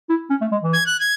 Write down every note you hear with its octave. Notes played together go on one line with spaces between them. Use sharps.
E4
C#4
A3
G#3
E3
G#6
F#6
G#6